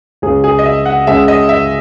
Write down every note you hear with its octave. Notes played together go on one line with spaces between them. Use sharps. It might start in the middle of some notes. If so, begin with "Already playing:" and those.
C#2 C#3 G#3 C#4 G#4
G#4
D#5
E5
F#5
C#2 C#3 G#3 C#4 E5
D#5
E5